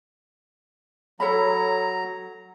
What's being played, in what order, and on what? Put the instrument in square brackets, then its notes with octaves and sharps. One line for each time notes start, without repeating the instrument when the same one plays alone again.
[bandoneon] F#3 A#5 [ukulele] A4 C#5 B5